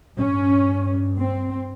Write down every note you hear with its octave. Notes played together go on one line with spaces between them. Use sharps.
G2 C#4
C4